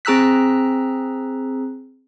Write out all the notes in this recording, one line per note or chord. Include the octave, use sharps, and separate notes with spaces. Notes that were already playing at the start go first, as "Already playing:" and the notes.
C4 G#4 A#5 E6 F#6 B6